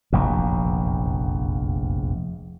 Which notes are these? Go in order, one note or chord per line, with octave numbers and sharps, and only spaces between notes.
F1 A#1 E2